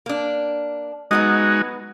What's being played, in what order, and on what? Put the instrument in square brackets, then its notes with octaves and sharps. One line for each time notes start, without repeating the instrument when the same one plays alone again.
[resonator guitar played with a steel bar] A#3 D4
[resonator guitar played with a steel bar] F#3 B3 D#5 [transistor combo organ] G#3 D#4 F#4